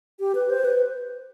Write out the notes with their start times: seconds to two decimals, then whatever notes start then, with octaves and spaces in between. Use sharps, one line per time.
0.20 G4
0.35 B4
0.50 C5
0.65 B4